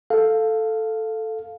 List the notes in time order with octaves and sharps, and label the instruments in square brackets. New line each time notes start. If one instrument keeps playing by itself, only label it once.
[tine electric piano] A4 F5